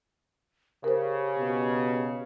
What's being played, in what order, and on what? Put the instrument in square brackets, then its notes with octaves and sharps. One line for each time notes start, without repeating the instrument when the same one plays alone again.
[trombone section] C#3 [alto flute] G4 [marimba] A#4 C5
[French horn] B2